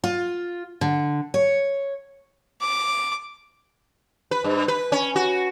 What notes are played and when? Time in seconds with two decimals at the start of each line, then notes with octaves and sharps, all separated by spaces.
0.04 F4
0.81 D3
1.34 C#5
2.61 D6
4.31 B4
4.44 G2
4.68 B4
4.92 C#4
5.16 F#4